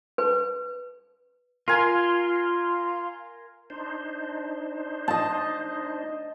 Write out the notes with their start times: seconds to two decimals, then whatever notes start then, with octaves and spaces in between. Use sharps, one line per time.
0.18 B4
1.68 F4 A#4 G#5
3.70 D4 D#4 C5
5.08 D#5 A5